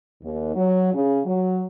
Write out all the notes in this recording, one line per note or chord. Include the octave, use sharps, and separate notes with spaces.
D#2
F#3
C#3
F#3